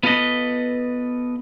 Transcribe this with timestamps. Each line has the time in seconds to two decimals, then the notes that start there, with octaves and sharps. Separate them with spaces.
0.03 B3 F4 A4 B4 D#5